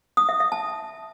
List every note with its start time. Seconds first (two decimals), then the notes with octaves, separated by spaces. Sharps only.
0.17 D#6
0.29 E5
0.40 E5
0.52 A5